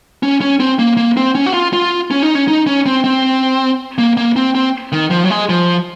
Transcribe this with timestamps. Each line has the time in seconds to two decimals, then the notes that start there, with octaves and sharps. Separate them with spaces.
0.23 C#4
0.41 C#4
0.60 C4
0.79 A#3
0.97 A#3
1.17 C4
1.35 C#4
1.46 F#4
1.54 F4
1.73 F4
2.11 C#4
2.23 D#4
2.35 C#4
2.48 D#4
2.67 C#4
2.86 C4
3.04 C4
3.98 A#3
4.17 A#3
4.36 C4
4.55 C4
4.92 D#3
5.11 F3
5.24 F#3
5.30 G#3
5.49 F3